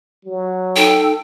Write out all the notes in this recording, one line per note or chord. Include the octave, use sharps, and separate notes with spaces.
F#3
D#4 A4 G5